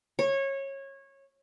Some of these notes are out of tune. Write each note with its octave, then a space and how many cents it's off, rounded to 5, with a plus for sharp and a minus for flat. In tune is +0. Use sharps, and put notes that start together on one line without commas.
C#5 -20